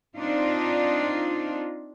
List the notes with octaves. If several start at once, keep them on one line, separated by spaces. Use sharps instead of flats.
C4 D4 D#4 F4